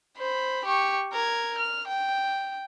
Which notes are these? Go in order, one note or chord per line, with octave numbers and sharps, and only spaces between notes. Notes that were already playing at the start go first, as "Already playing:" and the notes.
C5 B5
G4 C#6
A#4 G#6
F6
G5